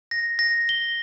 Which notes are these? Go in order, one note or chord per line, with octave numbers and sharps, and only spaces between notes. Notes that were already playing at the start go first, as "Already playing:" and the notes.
A#6
A#6
G7